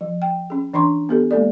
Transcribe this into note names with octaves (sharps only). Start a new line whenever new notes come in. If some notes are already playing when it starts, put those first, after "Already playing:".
F3
G5
C#4 G#4
E3 D4 A#5 C6 C#6
B3 G4 A4
G#3 A#3 A4 D5